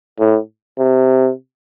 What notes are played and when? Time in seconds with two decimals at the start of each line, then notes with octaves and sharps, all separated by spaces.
0.20 A2
0.78 C3